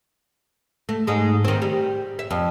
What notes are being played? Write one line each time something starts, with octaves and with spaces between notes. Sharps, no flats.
A3
G#2 G#3
D#3 C4
G3
E5
F2